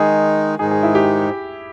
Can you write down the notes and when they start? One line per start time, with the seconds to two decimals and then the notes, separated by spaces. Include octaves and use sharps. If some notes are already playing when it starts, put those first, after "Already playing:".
Already playing: D#3 G#3 D#4 G#4
0.59 G#2 D#3 G#3 D#4 G#4
0.71 G#4
0.83 E4
0.95 G4